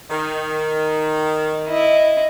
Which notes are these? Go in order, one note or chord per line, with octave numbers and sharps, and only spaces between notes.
D#3
E4 D#5